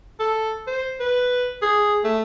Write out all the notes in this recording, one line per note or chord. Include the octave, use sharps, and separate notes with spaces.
A4
C5
B4
G#4
A3